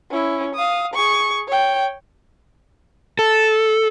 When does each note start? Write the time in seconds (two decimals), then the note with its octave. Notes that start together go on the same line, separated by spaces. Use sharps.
0.11 C#4 E4
0.55 F5 D#6
0.93 G#4 C#6
1.48 C#5 G5
3.19 A4